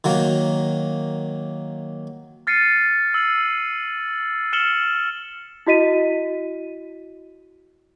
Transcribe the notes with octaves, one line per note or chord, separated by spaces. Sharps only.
D#3 F#3 A#3
F6 A6 C7 C#7 D#7
E6 F#7
F6 C#7 E7 F#7 G7
E4 F#4 D#5 B6 D#7